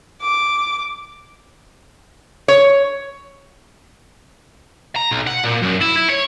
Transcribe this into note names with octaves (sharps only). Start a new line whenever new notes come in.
D6
C#5
A#5
B1
F#5
A#2
F#2
E4
E4
C#5